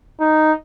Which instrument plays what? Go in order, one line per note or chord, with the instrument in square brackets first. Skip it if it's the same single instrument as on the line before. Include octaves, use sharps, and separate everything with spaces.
[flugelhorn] D#4